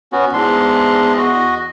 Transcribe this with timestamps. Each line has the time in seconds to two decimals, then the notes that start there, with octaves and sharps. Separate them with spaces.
0.12 B3 C#4 F#4
0.33 E2 G#2 D4 C6
1.18 F#4 D#5